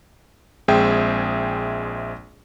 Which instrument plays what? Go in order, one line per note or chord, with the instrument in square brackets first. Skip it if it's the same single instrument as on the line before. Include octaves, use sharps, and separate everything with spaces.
[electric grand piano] A#1 G#3 C4 G#4 E5 G5